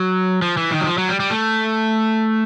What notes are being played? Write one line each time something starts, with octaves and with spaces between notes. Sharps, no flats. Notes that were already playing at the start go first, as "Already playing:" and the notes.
Already playing: F#3
F3
E3
D#3
F#3
F3
F#3
G3
G3
A3